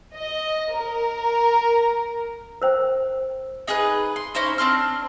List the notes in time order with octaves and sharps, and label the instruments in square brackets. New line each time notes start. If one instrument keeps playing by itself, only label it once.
[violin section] D#5
A#4
[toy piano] A#4 C5 G5
[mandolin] D#4 G#4 B4 F#6
C6
C#4 D#4 E4 C5
C4 D4 C6 F6